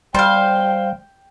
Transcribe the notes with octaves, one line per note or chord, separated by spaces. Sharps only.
G3 C5 F5 G5